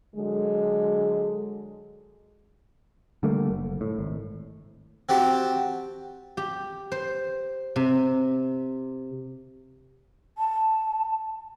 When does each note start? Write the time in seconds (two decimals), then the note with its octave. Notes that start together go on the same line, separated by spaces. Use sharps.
0.15 D3 F#3 G#3
3.23 D3 G3 A3 A#3
3.50 F#1
3.81 A2
3.99 G#1
5.09 C4 F#4 G4 A5
6.37 G4
6.92 C5
7.76 C3
10.38 A5